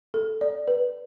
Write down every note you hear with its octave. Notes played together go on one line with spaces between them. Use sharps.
A4
D5
B4